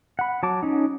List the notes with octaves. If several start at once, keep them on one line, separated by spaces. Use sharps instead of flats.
F#5 B5
F#3 A5 D6
C#4 D#4